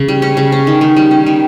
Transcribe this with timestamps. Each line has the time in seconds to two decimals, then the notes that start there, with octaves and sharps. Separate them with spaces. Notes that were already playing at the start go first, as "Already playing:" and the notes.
Already playing: C#3
0.08 G3
0.22 C#4
0.37 C#3
0.52 C#4
0.67 D#3
0.81 D#3
0.96 G3
1.11 C#4
1.26 D#3